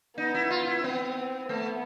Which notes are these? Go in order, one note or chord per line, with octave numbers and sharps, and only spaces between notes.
B3 D#4
E4
F4
E4
B3 C4
A3 B3